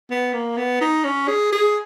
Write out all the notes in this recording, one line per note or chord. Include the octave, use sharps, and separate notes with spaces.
B3
A#3
B3
D#4
C#4
G#4
G#4